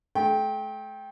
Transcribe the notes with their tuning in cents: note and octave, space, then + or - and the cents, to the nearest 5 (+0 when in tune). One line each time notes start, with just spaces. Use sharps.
A3 -40 G5 +0